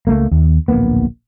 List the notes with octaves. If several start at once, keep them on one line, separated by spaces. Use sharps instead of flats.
C#2 A3 A#3
D#2
D1 A#1 A#3 B3